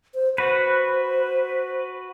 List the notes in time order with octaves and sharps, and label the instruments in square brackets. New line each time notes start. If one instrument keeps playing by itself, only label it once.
[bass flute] C5
[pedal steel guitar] F#4 B4 [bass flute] C5